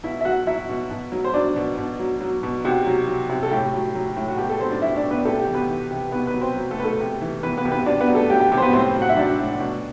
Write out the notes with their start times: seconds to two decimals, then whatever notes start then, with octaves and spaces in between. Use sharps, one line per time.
0.03 B2 E4 E5
0.21 E5
0.25 F#3 F#4 F#5
0.47 F#3 E4 E5
0.69 B2
0.91 B2
1.12 F#3
1.24 C5
1.34 F#3 D4 D5
1.56 B2
1.78 B2
2.00 F#3
2.21 F#3
2.43 B2
2.65 C3 F#4
2.86 F#3
3.08 F#3
3.29 C3
3.43 A4
3.51 A2 G4
3.73 F#3
3.95 F#3
4.17 A2
4.28 F#4
4.38 B2 G4
4.49 A3 A4
4.60 F#3 C4 C5
4.71 D4 D5
4.82 F#3 E4 E5
4.96 D4 D5
5.04 B2
5.11 B3 B4
5.25 C3 A3 A4
5.40 G4
5.47 E3
5.54 B3 B4
5.69 E3
5.91 C3
6.12 B2 B3 B4
6.27 B3 B4
6.34 F#3
6.41 C4 C5
6.56 F#3
6.71 A3 A4
6.78 B2 B4
6.84 A3 A4
7.00 C3
7.21 E3
7.43 E3 B3 B4
7.57 B3 B4
7.65 C3
7.72 B3 B4
7.86 C3 D4 D5
8.01 B3 B4
8.08 F#3
8.15 A3 A4
8.30 F#3 G4
8.40 G4
8.52 C3 G4
8.58 C5
8.62 B3 B4
8.73 A2 C4 C5
8.95 F#3
9.02 F#5
9.09 E5
9.17 F#3 D4 D5
9.39 A2
9.60 B2